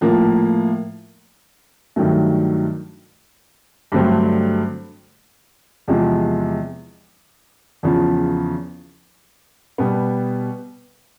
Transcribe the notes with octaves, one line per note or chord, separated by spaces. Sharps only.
A2 F3 A#3
G2 D#3 F#3 A3
G2 D3 F#3 A3 C4
E2 C3 F3 G#3
E2 C#3 F3
B2 G3 B3